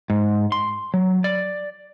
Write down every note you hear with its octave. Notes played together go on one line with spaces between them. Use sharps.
G#2
C6
F#3
D5